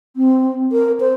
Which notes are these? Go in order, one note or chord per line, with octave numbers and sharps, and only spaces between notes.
C4
A#4
C5